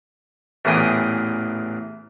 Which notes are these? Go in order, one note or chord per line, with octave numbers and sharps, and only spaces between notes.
A1 E2 A#2 G#4 G5 D#6